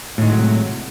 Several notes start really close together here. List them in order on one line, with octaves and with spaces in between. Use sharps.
A2 D#3 G#3 F#3 C3